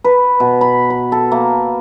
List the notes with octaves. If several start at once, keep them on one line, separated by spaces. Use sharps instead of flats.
B4
B2
B5
B5
A4
A#3